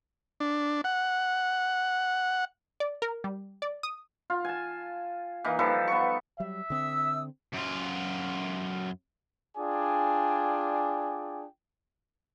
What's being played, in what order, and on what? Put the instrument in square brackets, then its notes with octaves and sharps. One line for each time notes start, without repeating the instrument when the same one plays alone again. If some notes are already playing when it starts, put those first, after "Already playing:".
[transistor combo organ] D4
F#5
[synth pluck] D5
A#4
G3
D5
D#6
[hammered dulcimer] F4
G#5 A5
E3 A#3 D#4
F3 G3 A4 B4
B3 C#6
[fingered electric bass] F#3 G3 [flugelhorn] E5
[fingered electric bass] D3 C4 [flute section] D#6 E6
[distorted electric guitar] F#2 F4
[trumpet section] D4 F4 G#4 D5 G5 G#5